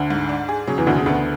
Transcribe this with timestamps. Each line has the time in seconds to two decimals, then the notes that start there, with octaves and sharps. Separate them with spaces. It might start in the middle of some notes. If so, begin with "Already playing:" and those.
Already playing: D2 D3
0.10 G#2
0.29 D4
0.49 G#4
0.67 C#3 F#3
0.78 E2 E3
0.87 D2 B2 D3
0.97 C#3
1.06 D2 D3 B3